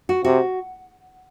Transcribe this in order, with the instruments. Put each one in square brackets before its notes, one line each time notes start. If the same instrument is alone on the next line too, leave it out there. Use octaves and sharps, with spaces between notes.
[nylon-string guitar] F#4
[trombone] C3 [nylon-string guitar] F#4